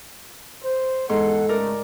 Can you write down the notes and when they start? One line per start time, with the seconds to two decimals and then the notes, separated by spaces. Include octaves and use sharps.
0.63 C5
1.09 E2 G#2 A4 F#5 C6
1.49 C#2 A3 A#4 D5